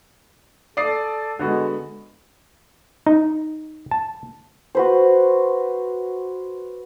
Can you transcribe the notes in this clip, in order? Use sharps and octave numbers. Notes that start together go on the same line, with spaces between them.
A4 D5 D#6 C7
D3 G#3 B3 F#4
D#4
A5
F#4 B4 C5